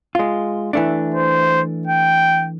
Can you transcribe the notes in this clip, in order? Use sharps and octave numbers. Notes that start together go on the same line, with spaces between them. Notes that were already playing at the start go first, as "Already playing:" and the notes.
G#3 F4
E3 A3 D4
C5
G5